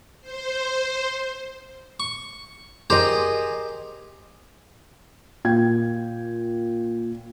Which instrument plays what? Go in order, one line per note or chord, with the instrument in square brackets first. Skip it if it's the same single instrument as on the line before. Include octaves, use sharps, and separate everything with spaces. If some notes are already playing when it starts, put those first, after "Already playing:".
[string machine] C5
[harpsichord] C#6
[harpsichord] G4 A#4 C5 [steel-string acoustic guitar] G#4 D#5
[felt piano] A#2 G5 G#6